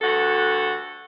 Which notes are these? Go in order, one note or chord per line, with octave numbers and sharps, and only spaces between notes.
D2 G2 D3 F#4 A4 F#5